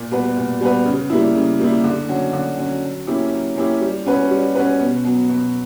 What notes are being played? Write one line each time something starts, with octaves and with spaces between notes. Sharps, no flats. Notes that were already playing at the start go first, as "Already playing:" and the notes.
Already playing: A#2
G3 B3 F#4 B4
A#2
G3 B3 F#4 B4
C#3
G3 A#3 E4
C#3
G3 A#3 E4
D3
F#3 C#4 F#4
D3
F#3 C#4 F#4
F#3
A#3 C#4 E4 G4
F#3
A#3 C#4 E4 G4
G3
C#4 F#4 B4
G3
C#4 F#4 B4
B2
F#3 B3
B2